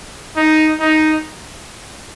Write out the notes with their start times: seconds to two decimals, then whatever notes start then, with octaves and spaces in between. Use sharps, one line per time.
0.36 D#4
0.80 D#4